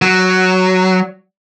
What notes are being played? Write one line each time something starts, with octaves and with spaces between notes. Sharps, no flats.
F#3